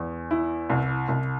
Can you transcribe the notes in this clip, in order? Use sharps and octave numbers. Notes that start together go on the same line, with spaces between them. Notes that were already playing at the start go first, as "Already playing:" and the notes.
Already playing: E2
E4
C2
C2